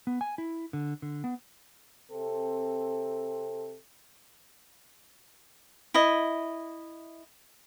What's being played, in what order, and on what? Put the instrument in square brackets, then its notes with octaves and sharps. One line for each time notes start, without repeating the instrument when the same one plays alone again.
[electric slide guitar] B3
G#5
E4
D3
D3
B3
[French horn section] C3 C4 A4
[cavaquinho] E4 D#5